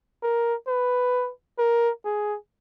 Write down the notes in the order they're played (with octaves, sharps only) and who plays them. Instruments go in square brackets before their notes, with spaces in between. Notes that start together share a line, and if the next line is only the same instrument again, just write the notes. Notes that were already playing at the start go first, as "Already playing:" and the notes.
[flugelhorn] A#4
B4
A#4
G#4